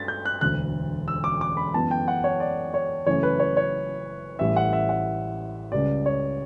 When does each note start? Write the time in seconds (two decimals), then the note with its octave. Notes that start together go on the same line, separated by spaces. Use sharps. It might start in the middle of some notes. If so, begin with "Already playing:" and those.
Already playing: G2 A6 B6
0.08 G6
0.25 F#6
0.41 E1 D2 D3 F#6
1.08 E6
1.24 D6
1.41 D6
1.57 B5
1.74 F#2 E3 B3 A5
1.91 G5
2.08 F#5
2.24 C#5
2.40 D5
2.74 C#5
3.07 F#1 F#2 E3 A3 C#4 C#5
3.23 B4
3.40 C#5
3.57 C#5
4.39 A1 A2 G3 C#4 E5
4.56 F#5
4.73 E5
4.89 F#5
5.72 C#2 C#3 G3 C#4 D5
6.06 C#5